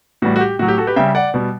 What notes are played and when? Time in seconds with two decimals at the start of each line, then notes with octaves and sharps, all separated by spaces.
0.22 A2 E3 G3 F#4
0.36 F#4
0.40 G4
0.59 A2 F#4
0.62 F#3
0.68 G4
0.78 F#4 A4
0.87 G4 B4
0.96 C#3 G3 E5 G5
1.15 D5 F#5
1.34 B2 G3